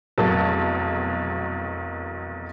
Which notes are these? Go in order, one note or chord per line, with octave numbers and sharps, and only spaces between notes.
F1 B1 E2 F#3 A#3 A5